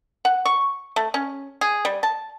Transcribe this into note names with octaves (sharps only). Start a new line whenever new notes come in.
F#5
C#6
A3
C#4
G#4
G3
A5